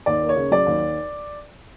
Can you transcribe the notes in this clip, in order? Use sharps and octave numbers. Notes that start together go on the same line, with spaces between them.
D#2 D5
A#3
C#5
C#3
F#3 D5
D#2